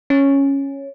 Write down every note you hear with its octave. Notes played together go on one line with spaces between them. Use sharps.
C#4